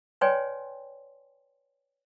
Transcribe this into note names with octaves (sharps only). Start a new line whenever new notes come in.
B4 C#5 D5 G5 G#5 C6